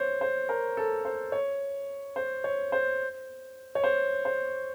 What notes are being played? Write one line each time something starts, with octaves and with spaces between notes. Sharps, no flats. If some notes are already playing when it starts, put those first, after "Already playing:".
Already playing: C5 C#5
C5
A#4
A4
C5
C#5
C5
C#5
C5
C#5
C5
C5